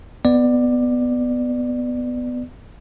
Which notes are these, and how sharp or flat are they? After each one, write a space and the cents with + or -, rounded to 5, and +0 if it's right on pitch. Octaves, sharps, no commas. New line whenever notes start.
B3 +10 D5 +15